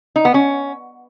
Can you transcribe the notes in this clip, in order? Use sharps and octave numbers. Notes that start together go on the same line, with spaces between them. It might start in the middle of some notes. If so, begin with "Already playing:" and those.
D#4
B3
C#4